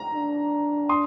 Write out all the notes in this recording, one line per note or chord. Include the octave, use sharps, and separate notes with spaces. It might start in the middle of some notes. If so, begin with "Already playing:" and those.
Already playing: A#5
D4
C6 D#6